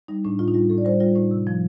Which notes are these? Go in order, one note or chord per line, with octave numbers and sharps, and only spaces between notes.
G3 D#4
A2 D4
A2 F4
D#4
G3 F4
A2 A4
D5
G3 C5
G3 F4
A2 D#4
C3
F3